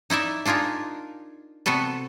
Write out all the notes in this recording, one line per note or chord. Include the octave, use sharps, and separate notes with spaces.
D#4 E4 D5 E5
D4 D#4 F4 G#4 A#4
C3 B3 F#4 A4 B4